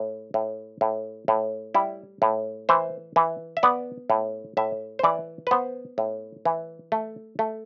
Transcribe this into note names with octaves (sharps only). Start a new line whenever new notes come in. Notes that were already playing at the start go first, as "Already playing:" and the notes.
Already playing: A2
A2
A2
A2
G3 E4
A2
E3 C5
E3
E5
B3 D5
A2
A2 E5
C5
E3 D5
B4
B3 C5
A2
E3
A3
A3